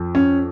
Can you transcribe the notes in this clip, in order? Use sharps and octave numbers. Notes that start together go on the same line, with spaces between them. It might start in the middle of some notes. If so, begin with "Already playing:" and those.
Already playing: F2 F3
C#4